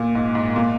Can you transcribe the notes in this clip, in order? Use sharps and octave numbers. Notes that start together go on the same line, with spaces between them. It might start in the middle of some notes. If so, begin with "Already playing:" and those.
Already playing: A#2
G#2
G#2
A#2